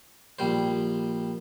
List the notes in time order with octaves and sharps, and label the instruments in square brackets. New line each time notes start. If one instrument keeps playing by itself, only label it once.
[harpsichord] A#1 G3 C5